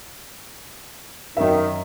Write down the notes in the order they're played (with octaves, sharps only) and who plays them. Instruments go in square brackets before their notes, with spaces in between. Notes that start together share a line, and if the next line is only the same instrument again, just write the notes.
[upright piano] F#2 E5 [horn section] D#3